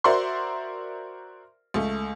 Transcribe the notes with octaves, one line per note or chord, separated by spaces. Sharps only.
F#4 A#4 C5 D5 E5 C6
C#2 A3